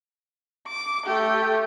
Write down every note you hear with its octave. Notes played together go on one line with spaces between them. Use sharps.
D6
A3 G4